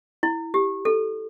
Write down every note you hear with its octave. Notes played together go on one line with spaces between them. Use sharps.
E4
G4
A4